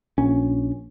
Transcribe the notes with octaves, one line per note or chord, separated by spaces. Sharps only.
A#1 C#4